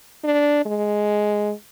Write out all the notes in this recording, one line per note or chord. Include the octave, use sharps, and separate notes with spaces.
D4
G#3